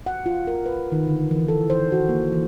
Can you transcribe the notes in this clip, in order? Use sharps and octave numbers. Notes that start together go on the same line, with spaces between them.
F#5
F4
A#4
B4
D#3
D3
E3
A4
C5
F#4
A#3
E3